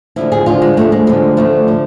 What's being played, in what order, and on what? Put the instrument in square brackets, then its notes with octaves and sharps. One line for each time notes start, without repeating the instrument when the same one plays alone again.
[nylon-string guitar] D2 D3 F3 E4
G#4
D2 D3 F3 F4
G#3
D2 D3 F3 A3
G#3
D2 D3 F3 G#3
D2 D3 F3 A3
D3 F3